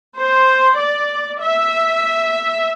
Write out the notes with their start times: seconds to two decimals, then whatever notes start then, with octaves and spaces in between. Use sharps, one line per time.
0.17 C5
0.77 D5
1.41 E5